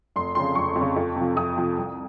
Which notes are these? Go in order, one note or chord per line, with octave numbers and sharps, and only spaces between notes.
F1 C6
F2 C#3 C6
F1 C#6
F2
C#3
F2
C3 F3
F2 D#6
C3 F3
C2